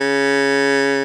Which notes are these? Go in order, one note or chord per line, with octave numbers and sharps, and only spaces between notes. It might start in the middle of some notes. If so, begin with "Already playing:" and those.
C#3